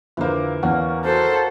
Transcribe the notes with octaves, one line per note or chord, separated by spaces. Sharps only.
F2 D3 E3 A#3 C5
E2 C#4 F#5
F#4 A4 C5